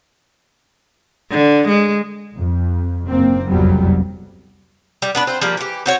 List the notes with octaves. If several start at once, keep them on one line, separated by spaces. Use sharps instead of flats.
D3
G#3
F2
F#1 A#3 C4
F#1 C2 F2 F#3 G3 B3
G3
B3 D4 B4
C4 F4 C5
F3 G3 A#3
E3 G4
C4 F#4 C#5